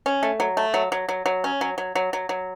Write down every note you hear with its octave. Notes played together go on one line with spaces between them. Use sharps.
C#4
A3
F#3
A3
F#3
F#3
F#3
F#3
C#4
F#3
F#3
F#3
F#3
F#3